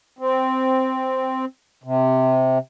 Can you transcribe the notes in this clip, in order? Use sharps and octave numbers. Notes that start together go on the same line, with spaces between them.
C4
C3